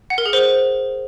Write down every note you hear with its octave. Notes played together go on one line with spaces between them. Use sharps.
F#5
A#4
G#4
C5